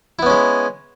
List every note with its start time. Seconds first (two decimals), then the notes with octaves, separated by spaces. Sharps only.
0.19 E4
0.22 B3
0.26 C#4
0.30 G#3